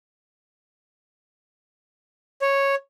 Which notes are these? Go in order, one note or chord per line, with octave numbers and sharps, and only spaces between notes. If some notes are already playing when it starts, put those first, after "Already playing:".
C#5